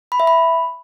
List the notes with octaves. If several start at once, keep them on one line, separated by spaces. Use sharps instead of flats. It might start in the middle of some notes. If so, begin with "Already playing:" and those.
B5
E5
B5